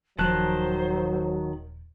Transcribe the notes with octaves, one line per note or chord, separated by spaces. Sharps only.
D#1 D#3 F3 F#3 C5 A5 F#6